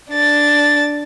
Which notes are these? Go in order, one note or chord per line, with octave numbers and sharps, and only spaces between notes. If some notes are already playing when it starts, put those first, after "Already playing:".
D4 A6